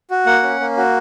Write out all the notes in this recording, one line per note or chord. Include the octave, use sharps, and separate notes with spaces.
F#4
A#3 F#5
C#4
A#3
F#4